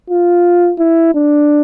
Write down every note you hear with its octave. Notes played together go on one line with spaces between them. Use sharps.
F4
E4
D4